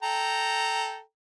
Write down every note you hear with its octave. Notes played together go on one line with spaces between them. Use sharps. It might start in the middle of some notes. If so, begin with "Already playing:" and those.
A4 G5 A#5